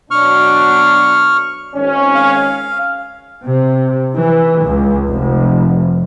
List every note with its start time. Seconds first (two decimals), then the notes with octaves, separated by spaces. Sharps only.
0.11 B2 F#3 D4 C#6 F6
1.75 G#1 C#4
2.15 F5
3.45 C3
4.15 E3
4.64 C#2
5.09 F1